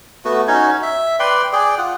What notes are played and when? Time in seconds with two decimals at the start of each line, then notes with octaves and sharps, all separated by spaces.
0.25 A3 B3 F#4
0.48 C#4 D#4 F#4 C#5
0.83 E5
1.20 B4 D5 G5 C6
1.53 G#4 D5 G5
1.78 F4 F#5